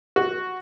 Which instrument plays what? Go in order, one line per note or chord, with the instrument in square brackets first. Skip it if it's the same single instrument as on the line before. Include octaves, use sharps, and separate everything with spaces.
[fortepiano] F#4